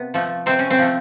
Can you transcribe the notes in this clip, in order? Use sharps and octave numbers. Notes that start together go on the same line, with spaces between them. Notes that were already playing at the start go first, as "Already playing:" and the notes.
Already playing: C3 B3
F3 A3
C3 C4
C#4
C4
F3 A3